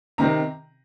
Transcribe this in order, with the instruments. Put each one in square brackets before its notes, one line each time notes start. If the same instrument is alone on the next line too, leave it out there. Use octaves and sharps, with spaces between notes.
[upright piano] C3 D#3 C4 A#5